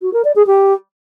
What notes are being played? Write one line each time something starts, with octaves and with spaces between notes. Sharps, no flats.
F#4
A#4
D5
G#4
G4